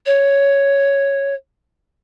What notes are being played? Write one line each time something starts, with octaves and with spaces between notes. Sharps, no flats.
C#5